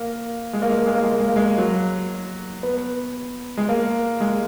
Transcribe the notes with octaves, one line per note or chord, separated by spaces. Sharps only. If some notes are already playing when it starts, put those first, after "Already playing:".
Already playing: A#3
G#3
A#3
G#3
A#3
G#3
A#3
G#3
A#3
G#3
A#3
G#3
F#3
B3
G#3
A#3
G#3